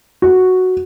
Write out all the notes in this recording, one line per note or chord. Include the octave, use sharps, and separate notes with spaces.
F#4